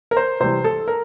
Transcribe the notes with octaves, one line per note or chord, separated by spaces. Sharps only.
A#4
C5
C3 E3 G3 C5
A4
A#4